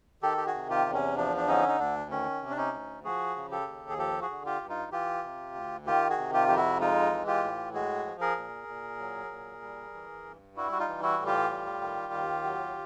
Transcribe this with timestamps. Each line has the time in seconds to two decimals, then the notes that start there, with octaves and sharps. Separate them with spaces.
0.22 D#3 G4 A4
0.37 G4
0.46 F#4 G#4
0.54 C3
0.70 F4 G4
0.86 E2
0.94 C#4
1.17 F3 D4
1.37 D4
1.47 D3 C#4 D#4
1.69 D#4
1.79 D2 D4
2.11 D#3 C#4
2.42 C3
2.50 D4
2.57 C#4 D#4
2.73 D2
3.04 F3 F#4 G#4
3.36 C#3
3.51 G4 A4
3.68 D#2
3.90 G#4
3.98 F3 G4 A4
4.21 F#4 G#4
4.30 D3
4.46 F4 G4
4.61 G2
4.69 D#4 F4
4.92 E3 F4 G4
5.24 C3
5.55 D2
5.86 D#3 F4 G4
6.10 F#4 G#4
6.18 C3
6.34 F4 G4
6.48 F2 G4
6.57 E4 F#4
6.81 G#3 D#4 F4
7.12 E3
7.27 F4 G4
7.44 A2
7.74 G#3 F#4 G#4
8.05 F3
8.21 G#4 A#4
8.37 A#2
8.68 A#2
8.99 F#3
9.31 A#2
9.62 G3
9.94 E3
10.25 G2
10.57 G3 E4 F#4
10.72 F#4
10.79 D#4 F4
10.88 E3
11.02 E4 F#4
11.19 A2
11.26 F4 G4
11.50 G3
11.81 D#3
12.13 D#2
12.44 F#3